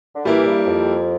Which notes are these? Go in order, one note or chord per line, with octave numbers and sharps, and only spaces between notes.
D3
E3 G3 A#3 E4
G2
F2